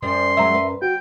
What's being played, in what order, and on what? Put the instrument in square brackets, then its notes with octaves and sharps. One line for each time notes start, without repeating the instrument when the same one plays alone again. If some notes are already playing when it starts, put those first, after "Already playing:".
[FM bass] F#2 [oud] F3 G3 C5 [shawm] C6
[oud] F#3 G#3 C5 [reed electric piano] E5 A#5
[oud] B4
[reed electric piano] F#4 [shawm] G5